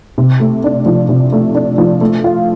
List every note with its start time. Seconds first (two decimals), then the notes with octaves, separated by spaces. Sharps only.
0.18 C3
0.40 A3
0.64 D4
0.86 F3
1.09 C3
1.32 A3
1.55 D4
1.78 F3
2.01 A3
2.24 F4